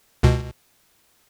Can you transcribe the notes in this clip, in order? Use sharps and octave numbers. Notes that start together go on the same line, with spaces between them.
C#2 B2